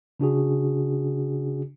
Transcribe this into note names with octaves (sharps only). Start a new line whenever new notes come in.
C#3 D4 F#4 G#4